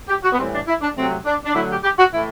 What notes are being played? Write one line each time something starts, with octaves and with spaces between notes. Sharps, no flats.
G4
F#4
B3
A2 E3 G3 C4
D4
E4
D4
C3 F#3 A3 C4
D4
D4
D3 F#3 A3 E4
G4
G4
F#4
A2 E3 A3 E4